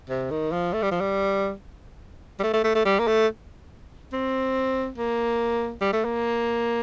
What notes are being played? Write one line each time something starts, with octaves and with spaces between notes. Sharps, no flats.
C3
D#3
F3
A3
G3
F3
G3
G3
A3
A3
A3
A3
G3
A#3
A3
C4
A#3
G3
A3
A#3